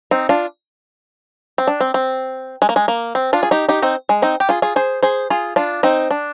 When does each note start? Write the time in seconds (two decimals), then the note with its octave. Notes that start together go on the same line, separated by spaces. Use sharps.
0.11 C4 D#4
0.29 D4 F4
1.58 C4
1.68 D4
1.81 C4
1.94 C4
2.62 G#3
2.69 A#3
2.76 G#3
2.88 A#3
3.15 C4
3.33 D4 F4
3.43 G#4
3.51 D#4 G4
3.69 D#4 G4
3.82 C4 D#4
4.09 G#3
4.22 C4 D#4
4.40 G4
4.49 F4 G#4
4.62 F4 G#4
4.76 G#4 C5
5.03 G#4 C5
5.30 F4 G#4
5.56 D4 F4
5.83 C4 D#4
6.11 D4